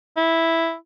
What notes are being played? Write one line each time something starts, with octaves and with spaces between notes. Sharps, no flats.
E4